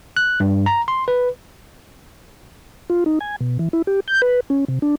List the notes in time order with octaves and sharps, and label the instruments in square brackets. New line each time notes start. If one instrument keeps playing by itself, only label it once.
[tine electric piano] F#6
G2
A#5
C6
B4
[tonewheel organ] F4
D#4
G#5
B2
E3
E4
G4
G6
B4
C#4
C3
D4